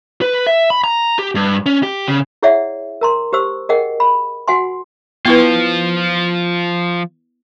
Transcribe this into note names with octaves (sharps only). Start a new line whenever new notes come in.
B4
E5
B5
A#5
G4
G2
C#4
G4
C#3
E4 G#4 C#5 D5 E5 F#5
A#4 A#5 C6
G4 C5 E6
G#4 A#4 D#5 F#5 G5
B5
F#4 F#5 G#5 C6
F3 B3 E4 F4 B4